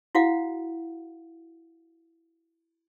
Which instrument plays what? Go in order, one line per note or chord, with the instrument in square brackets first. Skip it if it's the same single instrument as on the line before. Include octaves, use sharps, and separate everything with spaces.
[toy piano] E4 F#4 F5 F#5